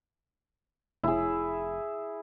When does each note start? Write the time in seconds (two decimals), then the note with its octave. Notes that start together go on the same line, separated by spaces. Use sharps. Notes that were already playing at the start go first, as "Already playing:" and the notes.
1.03 F1 E4 G#4